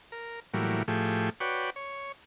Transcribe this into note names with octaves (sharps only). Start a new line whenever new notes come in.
A#4
A2 E3 F#3 G3 A#3
A2 F3 A3 G4 G#4
F#4 B4 C#5 D5 G5
C#5